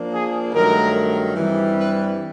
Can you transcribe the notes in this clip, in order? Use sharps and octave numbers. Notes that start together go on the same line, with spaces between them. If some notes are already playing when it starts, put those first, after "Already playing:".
Already playing: F3 A#3 D4
G#4
G2 D#3 F#3 A3 A#4
G2 E3 G3 C4
B4